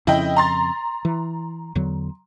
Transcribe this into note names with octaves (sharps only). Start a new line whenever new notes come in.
F2 C#3 E4 D#5 G5
A#5 C6 A6
E3
E2 D3 F#3